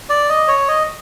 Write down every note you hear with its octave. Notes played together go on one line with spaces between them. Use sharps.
D5
D#5
C#5
D#5